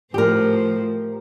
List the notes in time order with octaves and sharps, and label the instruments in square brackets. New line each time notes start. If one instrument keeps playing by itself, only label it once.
[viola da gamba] A2 F3 C5 [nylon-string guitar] G4 A#4